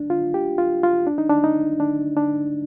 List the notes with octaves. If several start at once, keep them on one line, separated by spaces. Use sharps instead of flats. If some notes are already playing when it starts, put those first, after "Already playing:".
Already playing: D4
F4
G4
F4
F4
D4
D#4
D4
D#4
D4
D4